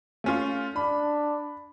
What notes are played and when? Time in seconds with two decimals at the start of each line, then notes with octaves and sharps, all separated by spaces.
0.24 A3 C#4 F4
0.76 D4 B5